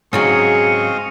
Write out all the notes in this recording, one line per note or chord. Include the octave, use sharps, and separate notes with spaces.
G#2 C#3 F#3 C4 G#4 D#5 F5 C#6